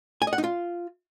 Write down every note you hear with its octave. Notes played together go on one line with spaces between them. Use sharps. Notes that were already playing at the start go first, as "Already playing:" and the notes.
G#5
D#5
F#5
D#4
F4